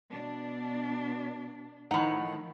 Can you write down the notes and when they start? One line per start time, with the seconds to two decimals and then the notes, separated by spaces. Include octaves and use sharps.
0.11 B2 D4
1.91 A2 D#3 F3 A3 D#4 F#5